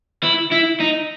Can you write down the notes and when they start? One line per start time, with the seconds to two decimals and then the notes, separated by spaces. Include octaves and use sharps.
0.23 E4
0.52 E4
0.80 D#4